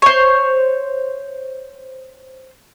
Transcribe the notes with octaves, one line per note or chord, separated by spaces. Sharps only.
C5 C#5